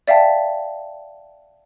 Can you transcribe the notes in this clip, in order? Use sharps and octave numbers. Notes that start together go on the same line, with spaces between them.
D5 E5 F5 G5 A5